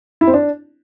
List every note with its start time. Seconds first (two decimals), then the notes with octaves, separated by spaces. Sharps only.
0.21 E4
0.27 C4
0.34 D4